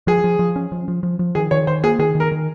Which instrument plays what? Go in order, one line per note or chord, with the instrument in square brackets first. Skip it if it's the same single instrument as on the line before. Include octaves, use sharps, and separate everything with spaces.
[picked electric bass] F3 [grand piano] G#4
[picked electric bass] F3
F3
C#4
F3
F3
F3
F3
[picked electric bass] D#3 [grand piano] G#4
[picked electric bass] D#3 [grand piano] C#5
[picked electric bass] D#3 [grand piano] C5
[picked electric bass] A#3 [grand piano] G#4
[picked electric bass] D#3 [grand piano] G#4
[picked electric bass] D#3
[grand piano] A#4
[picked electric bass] D#3